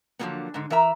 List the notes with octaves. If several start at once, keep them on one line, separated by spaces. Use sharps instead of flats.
D3 F3 F#3 G#3 A#3 B3
G#2 D3
E3 A#4 E5 A#5